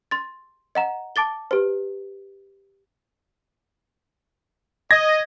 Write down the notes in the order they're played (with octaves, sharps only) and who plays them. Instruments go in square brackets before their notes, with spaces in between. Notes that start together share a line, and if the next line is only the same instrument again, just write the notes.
[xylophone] C6 A6
D#5 F#5 A#5
A5 D6 A6 G7
G4 B4 C5
[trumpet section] D#5 [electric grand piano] G#6 A#6